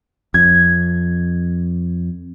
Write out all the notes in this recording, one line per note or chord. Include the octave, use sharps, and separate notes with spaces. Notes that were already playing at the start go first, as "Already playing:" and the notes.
F2 G#6